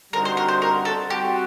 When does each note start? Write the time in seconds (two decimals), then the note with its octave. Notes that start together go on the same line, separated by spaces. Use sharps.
0.13 D3 G3 C4 D#4 F#4 A#4
0.25 C5
0.37 A#4
0.48 C5
0.62 A#4
0.85 A4
1.10 G3 C4 F#4 G4